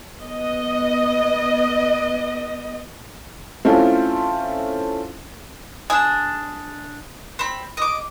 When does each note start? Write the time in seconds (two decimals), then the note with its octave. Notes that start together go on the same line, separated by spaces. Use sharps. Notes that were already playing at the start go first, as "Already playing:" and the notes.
0.21 B3 D#5
3.65 A3 C4 C#4 E4 F4
5.90 D4 G#4 E6
7.39 C4 B5
7.77 D#5 D6